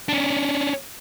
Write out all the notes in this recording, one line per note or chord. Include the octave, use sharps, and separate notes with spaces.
C#4 D4